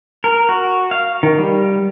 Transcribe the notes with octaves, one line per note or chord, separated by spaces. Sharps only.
A#4
F#4
F5
D#3
G3